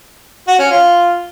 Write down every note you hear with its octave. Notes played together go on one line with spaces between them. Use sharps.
F#4
C#4
F4